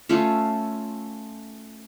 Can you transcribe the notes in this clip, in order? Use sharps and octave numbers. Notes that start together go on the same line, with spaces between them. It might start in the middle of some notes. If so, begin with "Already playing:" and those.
A3 C#4 F4